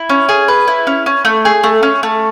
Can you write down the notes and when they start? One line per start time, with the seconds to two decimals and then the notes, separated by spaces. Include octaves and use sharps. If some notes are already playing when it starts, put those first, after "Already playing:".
Already playing: E4
0.09 C#4
0.29 G#4
0.48 B4
0.68 E4
0.87 C#4
1.06 C#4
1.25 A3
1.45 G#4
1.63 A3
1.83 C#4
2.03 A3